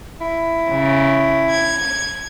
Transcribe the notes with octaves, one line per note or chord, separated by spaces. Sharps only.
E4
C#3
G#6